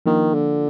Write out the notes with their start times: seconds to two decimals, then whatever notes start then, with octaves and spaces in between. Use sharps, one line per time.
0.06 D#3 F3 A#3 D4 F4
0.34 D3